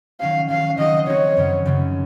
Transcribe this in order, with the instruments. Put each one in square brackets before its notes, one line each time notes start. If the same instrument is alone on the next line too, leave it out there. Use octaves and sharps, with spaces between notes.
[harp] D#3 F#3 C#4 [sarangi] F5
[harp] D#3 F#3 C#4 [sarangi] F5
[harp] D#3 F#3 C4 D#4 F#4 [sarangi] D#5
[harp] D#3 F#3 C4 D#4 F#4 [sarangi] C#5
[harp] F#2 C#3 F#3 C#4
F#2 C#3 F#3 C#4